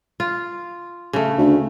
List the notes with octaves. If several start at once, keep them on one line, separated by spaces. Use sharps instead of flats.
F4
C#3 A3
D2